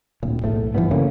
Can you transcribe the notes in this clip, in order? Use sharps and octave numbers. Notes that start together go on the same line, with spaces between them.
D1 A#2
B1 E2 A2 A3
G2 E3 F3 B3
C#3 A3 A#3 C#4